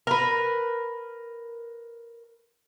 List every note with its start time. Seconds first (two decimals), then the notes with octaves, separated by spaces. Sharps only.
0.07 A#4 B4